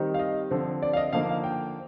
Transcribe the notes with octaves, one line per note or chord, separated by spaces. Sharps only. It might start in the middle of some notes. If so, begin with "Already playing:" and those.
Already playing: D#3 G3 C4 D#4
F5
D#5
D3 F3 C4
D5
F5
D#5
D3 F3 A#3 D#4 F5
F5
G5